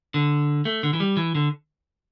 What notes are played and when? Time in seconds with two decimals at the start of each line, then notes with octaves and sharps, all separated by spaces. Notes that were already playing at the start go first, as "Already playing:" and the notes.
0.14 D3
0.65 A3
0.83 D3
0.93 E3
1.00 G3
1.17 E3
1.35 D3